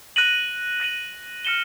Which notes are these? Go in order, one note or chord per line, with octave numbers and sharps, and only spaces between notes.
F#6 A#6 D#7 F#7
F#6 A#6 D#7 F#7
F6 A#6 C#7 E7 G7